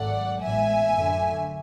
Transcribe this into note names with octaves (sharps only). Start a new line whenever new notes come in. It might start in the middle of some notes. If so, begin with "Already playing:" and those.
Already playing: G#1 G#2 F#3 A3 D5 F#5
A1 A2 G#3 B3 E5 G#5
F#2 D3 F#3 A3